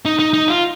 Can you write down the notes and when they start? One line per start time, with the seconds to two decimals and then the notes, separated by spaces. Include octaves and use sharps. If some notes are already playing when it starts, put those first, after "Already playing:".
0.05 D#4
0.19 D#4
0.33 D#4
0.48 F4